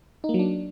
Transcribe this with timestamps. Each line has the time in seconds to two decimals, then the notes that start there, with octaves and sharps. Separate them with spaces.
0.24 D#4
0.29 A#3
0.34 F#3
0.39 D4